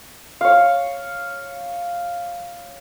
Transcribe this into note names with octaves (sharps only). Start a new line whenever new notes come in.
C#5 F5